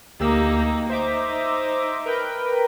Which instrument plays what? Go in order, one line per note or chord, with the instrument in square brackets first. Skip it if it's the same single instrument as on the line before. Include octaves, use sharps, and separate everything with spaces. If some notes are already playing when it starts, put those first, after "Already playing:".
[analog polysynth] D2 G4 E6 [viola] A#3 D#4
[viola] D#4 [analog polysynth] C5 E5 D6
[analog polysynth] A#4 B4 G5